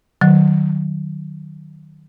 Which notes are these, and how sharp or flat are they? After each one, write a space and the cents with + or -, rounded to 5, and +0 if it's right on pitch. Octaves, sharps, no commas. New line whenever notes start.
D#3 -30 F#3 +5